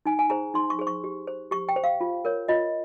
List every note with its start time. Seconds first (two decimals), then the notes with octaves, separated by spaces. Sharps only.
0.06 D#4 G#5
0.19 G#5
0.30 G#4 C5 A#5
0.54 D#4 C6
0.70 C#6
0.79 G#4 C5
0.87 C#6
1.04 G4
1.27 C5
1.51 G4 C#6
1.69 G5
1.76 C5
1.84 F5
2.01 F4
2.25 A#4 C#5
2.48 F4 D#5